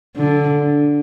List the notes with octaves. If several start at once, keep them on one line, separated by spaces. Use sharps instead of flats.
D3